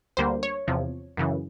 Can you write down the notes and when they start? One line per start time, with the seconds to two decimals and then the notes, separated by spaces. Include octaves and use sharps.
0.17 D2 D3 G3 A#3 C5
0.43 C#5
0.67 E2 C3 F3
1.17 F#2 C#3 E3